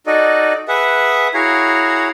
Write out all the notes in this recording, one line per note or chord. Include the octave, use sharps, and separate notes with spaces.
D#4 F#4 A4 D5 D#5
G#4 B4 E5 F#5
E4 F#4 G#4 C#5 F5 A#5